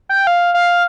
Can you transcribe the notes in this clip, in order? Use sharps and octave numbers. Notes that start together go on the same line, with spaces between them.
G5
F5
F5